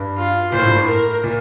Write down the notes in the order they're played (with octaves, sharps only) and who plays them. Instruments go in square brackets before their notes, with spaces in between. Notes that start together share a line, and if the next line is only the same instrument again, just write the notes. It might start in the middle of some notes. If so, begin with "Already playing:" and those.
Already playing: [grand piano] G2
[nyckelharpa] F4
[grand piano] A#2 [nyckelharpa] C5
[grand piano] A2
G2
A2
[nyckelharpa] A#4
[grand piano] A#2